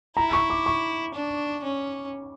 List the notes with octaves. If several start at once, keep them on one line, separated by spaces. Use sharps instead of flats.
E4 A#5
C#6
D6
C#6
D4
C#4